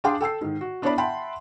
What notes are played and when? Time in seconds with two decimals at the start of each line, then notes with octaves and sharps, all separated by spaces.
0.04 D4 G#4 F5 G5 C6 D6
0.21 A4 G5 E6 C7
0.41 G#2 D#3
0.61 F#4
0.82 B3 D4 E4 C#5 D5 B5
0.98 E5 F#5 G5 A5 B5 C6